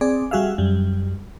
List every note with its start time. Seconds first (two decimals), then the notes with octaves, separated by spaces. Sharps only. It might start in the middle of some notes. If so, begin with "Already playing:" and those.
0.01 C4 G#4 D5
0.31 G3 F#4 G#4 E5 F5
0.58 F#2 G3